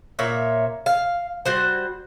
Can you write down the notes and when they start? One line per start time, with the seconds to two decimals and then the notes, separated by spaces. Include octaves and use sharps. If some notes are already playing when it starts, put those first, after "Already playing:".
0.19 A#2 C#5 E5
0.86 F5
1.45 G3 F#4 C5